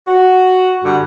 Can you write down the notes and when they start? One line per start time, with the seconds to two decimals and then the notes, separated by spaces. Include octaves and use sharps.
0.08 F#4
0.84 G2 D3 F#5